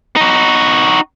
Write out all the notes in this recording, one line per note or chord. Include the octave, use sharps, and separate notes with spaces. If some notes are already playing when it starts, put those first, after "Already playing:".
D#4 F#4